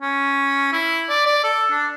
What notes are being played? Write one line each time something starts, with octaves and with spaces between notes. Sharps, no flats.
C#4
E4
D5
D5
A4
D4